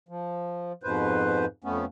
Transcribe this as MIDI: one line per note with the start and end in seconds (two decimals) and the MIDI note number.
0.09 0.72 53
0.83 1.45 41
0.83 1.45 44
0.83 1.45 47
0.83 1.45 71
0.83 1.45 72
1.64 1.85 41
1.64 1.85 57
1.64 1.85 59
1.64 1.85 61